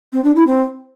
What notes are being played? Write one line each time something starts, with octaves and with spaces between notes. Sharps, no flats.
C4
D4
E4
C4